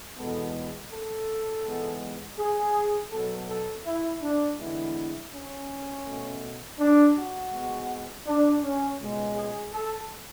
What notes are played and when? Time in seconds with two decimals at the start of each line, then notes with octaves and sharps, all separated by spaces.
0.16 E2 B2 G#3 B3 A4
0.90 A4
1.63 G#2 E3 G#3 B3
2.37 G#4
3.11 B2 F#3 B3 A4
3.48 A4
3.85 E4
4.21 D4
4.58 E2 D3 G#3 B3 E4
5.31 C#4
6.04 B2 A3
6.78 D4
7.15 F#4
7.51 G#2 G#3 B3
8.26 D4
8.61 C#4
8.99 C#2 B2 G#3
9.35 G#4
9.72 A4